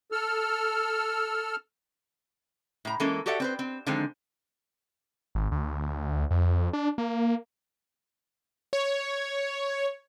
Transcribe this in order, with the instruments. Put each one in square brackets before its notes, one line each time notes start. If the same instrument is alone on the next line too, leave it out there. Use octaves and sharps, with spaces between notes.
[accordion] A4 E6 F6
[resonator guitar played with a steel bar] A2 A#5
E3 G#3 A#3 C#4 A4 A#4
F#4 G4 A4 D5 E5 F#5
C4 B4 C5
C4
D3 D#3 F3 G#3 C4
[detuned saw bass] G#1
D2
F2
D4
A#3
[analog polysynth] C#5